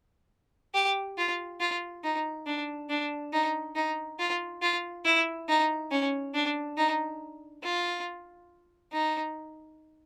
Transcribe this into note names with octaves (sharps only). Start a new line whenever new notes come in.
G4
F4
F4
D#4
D4
D4
D#4
D#4
F4
F4
E4
D#4
C#4
D4
D#4
F4
D#4